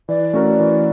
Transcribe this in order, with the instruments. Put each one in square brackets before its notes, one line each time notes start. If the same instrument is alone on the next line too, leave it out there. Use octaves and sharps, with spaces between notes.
[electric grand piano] E3 [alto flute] D5
[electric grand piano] A3 C#4 F#4 A#4
E3